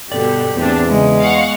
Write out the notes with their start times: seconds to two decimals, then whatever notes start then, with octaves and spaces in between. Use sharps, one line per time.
0.12 G2 B2 D3 B3 G4 D5
0.57 E2 A2 C4 D4
0.89 C#3 G#3
1.20 F5 F#5 C#6